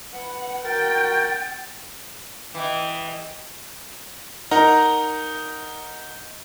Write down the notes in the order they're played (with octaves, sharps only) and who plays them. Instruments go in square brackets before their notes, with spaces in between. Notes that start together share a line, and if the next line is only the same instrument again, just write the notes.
[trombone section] B4 [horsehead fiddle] F#5
[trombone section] F#4 [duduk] A#4 [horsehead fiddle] G5 [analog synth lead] A6
[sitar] E3 [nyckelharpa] D#5 G5
[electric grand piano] D#4 A#4 F#5 A#5